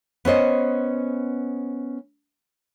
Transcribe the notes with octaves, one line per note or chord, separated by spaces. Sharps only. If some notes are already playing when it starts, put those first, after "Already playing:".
B3 C#4 C5 D#5